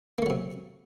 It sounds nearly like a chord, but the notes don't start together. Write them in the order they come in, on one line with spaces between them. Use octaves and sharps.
A#3 A3 F#3 C3